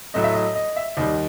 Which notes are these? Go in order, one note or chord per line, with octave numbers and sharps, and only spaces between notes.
A2 F#3 A3 D#5
E5
D#5
D#5
E5
D#2 D#3 G3 D#5